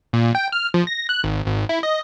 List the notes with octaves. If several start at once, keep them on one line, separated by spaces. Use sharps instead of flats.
A#2
G5
F6
F3
A#6
F#6
G#1
G#1
E4
D#5